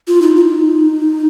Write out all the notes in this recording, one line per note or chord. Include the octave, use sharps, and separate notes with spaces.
F4
D#4
F4
D#4